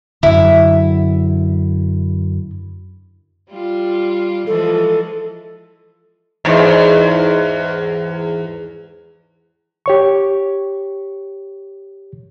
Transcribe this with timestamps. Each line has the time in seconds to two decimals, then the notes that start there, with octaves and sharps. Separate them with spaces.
0.23 F#2 D3 E4
3.50 G3 F4
4.47 E3 F3 G#3 A4
6.45 E2 G#2
9.86 G4 C#5 C#6